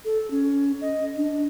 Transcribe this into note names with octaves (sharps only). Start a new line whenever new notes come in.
A4
C#4
D#5
D4